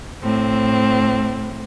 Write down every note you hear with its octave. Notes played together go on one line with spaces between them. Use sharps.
A2 C4